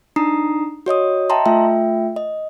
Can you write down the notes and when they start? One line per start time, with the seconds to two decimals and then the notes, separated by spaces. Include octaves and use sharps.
0.16 D4 D#4 A#5 D#6 C7
0.86 F#4 C#5 D#5 D#6
1.30 D#5 E5 G5 A5 A#5 C6
1.46 A3 F4 E5 G5
2.16 D#5